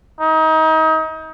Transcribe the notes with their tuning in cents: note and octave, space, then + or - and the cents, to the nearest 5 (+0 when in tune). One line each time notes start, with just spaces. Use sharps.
D#4 +30